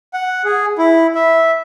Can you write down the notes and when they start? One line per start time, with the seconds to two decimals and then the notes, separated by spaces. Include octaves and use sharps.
0.14 F#5
0.45 G#4
0.78 E4
1.15 E5